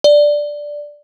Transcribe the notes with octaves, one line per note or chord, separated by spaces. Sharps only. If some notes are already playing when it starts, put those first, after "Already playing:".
D5